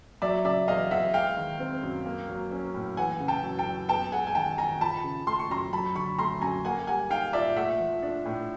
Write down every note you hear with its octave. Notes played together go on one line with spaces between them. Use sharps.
F#3 D5 E5
C#3 D5 E5
E2 D#5 F5
E2 E5 F#5
G#3 F5 G5
D#3
C4
F#2
A#3
F#3
C#4
A2
E3 F#5 G#5
C#3
G5 A5
F#2
G5 A5
F#2
B3 G5 A5
G#3 F#5 G#5
G#5
D#3 G5 A5
D#3 G#5 A#5
F3 A5 B5
C#3
A3 C6
C#6
F#2 A#5 C6
F#3 A5 B5
D3 B5 C#6
A3 A#5 C6
F#2 G#5 A#5
A#3 F#5 G#5
G3 F#5 G#5
D#4 F5 G5
A#2 D5 E5
A3 E5 F#5
F3
D4
A2